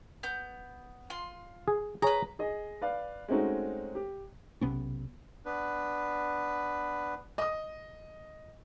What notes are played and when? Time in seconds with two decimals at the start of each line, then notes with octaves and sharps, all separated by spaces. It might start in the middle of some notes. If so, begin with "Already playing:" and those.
0.23 B3 G6
1.10 F4 C6
1.68 G#4
2.02 G#4 B4 C#5 A#5
2.39 G#4 D#5
2.82 B4 D5 F5
3.28 G#3 A3 C4 C#4 D#4 F#4
3.95 G4
4.61 B1 C3 B3 C#4
5.45 B3 D4 B4
7.38 D#5 D#6